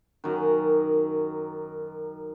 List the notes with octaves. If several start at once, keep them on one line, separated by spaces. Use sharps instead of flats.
F#2 D#3